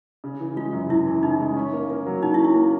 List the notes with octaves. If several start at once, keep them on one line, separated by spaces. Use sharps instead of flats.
C#3
E3
G#3 F4
F#2
F#2 E4
E3
C#3 D#4
G#3
C#4
A#3
A#3
F#3
F#3 D#4
E4
C#4
E4
A#3